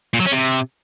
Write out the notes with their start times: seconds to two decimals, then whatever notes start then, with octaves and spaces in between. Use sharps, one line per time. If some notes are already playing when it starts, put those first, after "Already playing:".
0.14 A#2
0.20 F#3
0.26 C#4
0.32 C3